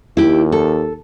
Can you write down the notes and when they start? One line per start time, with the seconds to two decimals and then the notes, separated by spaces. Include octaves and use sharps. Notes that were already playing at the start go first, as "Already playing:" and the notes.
0.17 D#2 E4 G4
0.52 A4